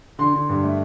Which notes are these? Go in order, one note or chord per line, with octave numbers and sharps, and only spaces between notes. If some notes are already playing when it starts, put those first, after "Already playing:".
D3 C6
D3
G2
A3